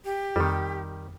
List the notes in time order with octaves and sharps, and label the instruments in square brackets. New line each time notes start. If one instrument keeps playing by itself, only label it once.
[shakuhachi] G4
[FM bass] F2 [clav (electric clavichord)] D#3 G3